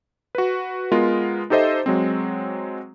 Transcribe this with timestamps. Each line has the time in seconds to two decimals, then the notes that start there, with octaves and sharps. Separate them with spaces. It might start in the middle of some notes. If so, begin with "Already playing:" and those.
0.35 F#4 B4
0.92 G#3 B3 F4 A#4
1.50 D#4 G4 A4 C5 D#5 E5
1.86 F#3 G#3 C4